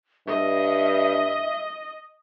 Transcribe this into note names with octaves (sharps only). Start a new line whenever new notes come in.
G2 D#5 E5